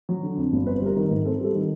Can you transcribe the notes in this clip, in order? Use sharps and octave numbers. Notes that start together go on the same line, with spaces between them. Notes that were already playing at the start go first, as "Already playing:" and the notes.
F#3
D3
F2
G1
C4 B4
G3 A#4
D#3
A#4
G#2
C4 A4
G3 A4
D#3